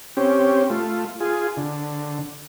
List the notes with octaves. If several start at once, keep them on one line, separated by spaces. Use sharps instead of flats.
C4 C#4 G4
A3 F4
F4 G#4
D3